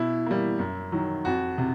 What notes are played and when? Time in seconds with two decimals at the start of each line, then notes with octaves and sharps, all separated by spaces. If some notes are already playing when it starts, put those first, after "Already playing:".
Already playing: B2 E4
0.26 G3 A#3
0.59 F#2
0.92 D#3 F#3
1.25 F2 F#4
1.58 C3